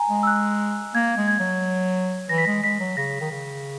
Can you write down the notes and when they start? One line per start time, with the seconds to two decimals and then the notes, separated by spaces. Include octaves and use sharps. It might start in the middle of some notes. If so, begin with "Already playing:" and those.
Already playing: G#5 A#5
0.09 G#3
0.23 E6
0.27 F#6
0.95 A#3 G#6
1.17 G#3
1.28 G#6
1.40 F#3
2.29 E3 A#6
2.38 B6
2.45 G#3 A#6
2.64 G#3 B6
2.80 F#3
2.97 C#3 A#6
3.21 D#3
3.31 C#3